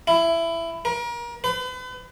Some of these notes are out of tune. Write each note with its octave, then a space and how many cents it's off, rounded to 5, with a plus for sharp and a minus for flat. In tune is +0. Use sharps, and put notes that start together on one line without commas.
E4 +15
A#4 +35
B4 +40